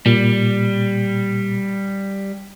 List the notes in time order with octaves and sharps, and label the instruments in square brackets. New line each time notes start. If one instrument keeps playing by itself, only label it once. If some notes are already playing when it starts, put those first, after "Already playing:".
[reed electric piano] A#2 [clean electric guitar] G3